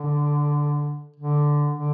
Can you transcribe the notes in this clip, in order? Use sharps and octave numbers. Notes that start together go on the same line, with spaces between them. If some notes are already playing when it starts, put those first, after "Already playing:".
Already playing: D3
D3
D3